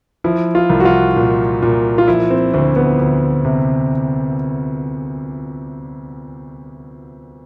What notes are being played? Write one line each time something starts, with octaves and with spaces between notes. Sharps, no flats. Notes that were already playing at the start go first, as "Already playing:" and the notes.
F3 E4
F4
C2
F#4
F4
A#2
A#2
F4
F3 E4
C4
D2 C4
B3
D2
C3